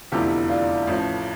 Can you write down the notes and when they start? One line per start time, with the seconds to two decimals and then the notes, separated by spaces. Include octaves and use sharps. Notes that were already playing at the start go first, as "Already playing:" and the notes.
0.12 F1 E2 D3 F3 E4 G4
0.50 D4 F4
0.87 A1 A2 F3